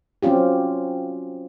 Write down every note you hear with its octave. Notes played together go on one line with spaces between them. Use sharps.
F#3 C4 C#4 F4 G4